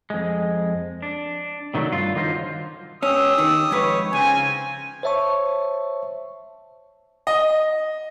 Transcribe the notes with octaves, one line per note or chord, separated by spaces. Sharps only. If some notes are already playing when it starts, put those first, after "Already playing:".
F2 G#3
D4
C3 D#3 F#3 A3 D4
G2 F4
D3 D#3 F#3 D#4 F4 C5
C#4 G4 D#6 E6
D#3
F2 G#2 B4 C#5
C#3 C4 C#4 F4 G#5
C5 C#5 E5 A5 C#6
D#5